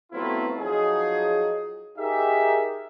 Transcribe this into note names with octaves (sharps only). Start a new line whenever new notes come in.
F#3 A3 B3 C4 E4 F4
F3 F#3 D#4 G#4
D#4 G4 G#4 A#4 E5